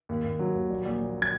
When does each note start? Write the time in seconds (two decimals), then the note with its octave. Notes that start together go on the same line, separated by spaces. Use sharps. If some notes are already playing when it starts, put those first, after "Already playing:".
0.09 D#2
0.24 D#2
0.39 F#3
0.54 D#2
0.70 A#1
0.85 A#1
1.01 A#2
1.22 G#6